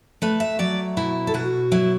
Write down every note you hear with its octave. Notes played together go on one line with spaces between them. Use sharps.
A3 B4
E5
F#3 D5
B2 E4
A4
B2 F#4
F#3 E4